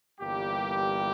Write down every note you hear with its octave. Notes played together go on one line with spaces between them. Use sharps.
G1 G2 E3 G3 A#3 G4